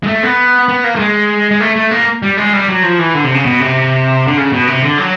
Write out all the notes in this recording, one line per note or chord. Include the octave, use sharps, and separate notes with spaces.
G#3
A3
B3
B3
A#3
A3
G#3
G#3
A3
A3
A#3
G3
G#3
G3
F#3
F3
E3
D3
C3
C#3
B2
C3
D3
C#3
B2
C3
D3
F#3